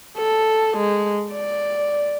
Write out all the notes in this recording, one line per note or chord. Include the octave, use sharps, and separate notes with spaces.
A4
G#3
D5